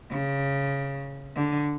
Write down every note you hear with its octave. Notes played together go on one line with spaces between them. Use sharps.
C#3
D3